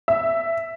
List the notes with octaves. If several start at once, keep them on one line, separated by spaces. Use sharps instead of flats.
E5